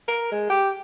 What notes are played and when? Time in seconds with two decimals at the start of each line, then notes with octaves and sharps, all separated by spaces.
0.08 A#4
0.32 G#3
0.50 G4